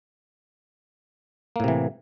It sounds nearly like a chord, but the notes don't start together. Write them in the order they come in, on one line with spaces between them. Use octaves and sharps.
A#3 A2 C3 E3